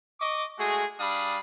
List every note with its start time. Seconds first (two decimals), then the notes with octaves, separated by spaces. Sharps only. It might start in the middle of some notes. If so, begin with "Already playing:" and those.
0.21 D#5 C#6 D6
0.59 G#3 A3 F#4 G#4
1.00 G3 D4 F5 B5 D#6